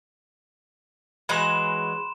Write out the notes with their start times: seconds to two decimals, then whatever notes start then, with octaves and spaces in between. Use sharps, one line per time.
1.29 E3 F#3 G#3 B5 C6 E7